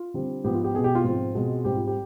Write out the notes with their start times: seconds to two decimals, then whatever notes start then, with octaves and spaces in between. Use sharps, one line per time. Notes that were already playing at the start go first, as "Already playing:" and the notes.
Already playing: F4
0.14 D3 G3 C4
0.44 G#2 F3 B3 G4
0.54 F4
0.64 G4
0.75 B2 B3 G#4
0.84 G4
0.95 F4
1.04 G#2 F3 C4
1.35 B2 G#3 C4
1.65 G#2 G3 C4 G4
1.76 F4
1.87 G4